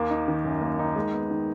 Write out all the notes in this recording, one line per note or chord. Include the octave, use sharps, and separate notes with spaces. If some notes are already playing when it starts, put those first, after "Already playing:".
Already playing: D#2 A#3
D#4
D#3
F#2
A#3
D#4
G#3
B3
D#3